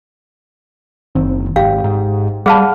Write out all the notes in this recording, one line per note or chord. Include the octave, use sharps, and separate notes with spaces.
F#1 D#3 C4
G#1 G4 F5 G5
G#2
G3 G#4 F5 F#5 A5 B5 F6